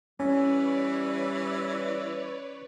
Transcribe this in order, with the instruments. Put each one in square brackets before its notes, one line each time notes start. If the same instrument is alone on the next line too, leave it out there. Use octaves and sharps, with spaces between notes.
[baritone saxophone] E3 [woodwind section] G3 [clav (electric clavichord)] C#4 [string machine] B4 C#5 D5